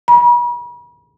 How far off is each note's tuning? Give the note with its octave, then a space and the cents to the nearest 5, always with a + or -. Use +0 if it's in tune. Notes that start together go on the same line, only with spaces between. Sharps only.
B5 -40